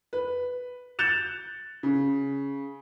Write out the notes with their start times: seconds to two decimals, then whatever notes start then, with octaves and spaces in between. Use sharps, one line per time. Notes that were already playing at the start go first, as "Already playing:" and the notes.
0.13 B4
0.99 F#6 G6 A6 C#7 E7 F7
1.83 C#3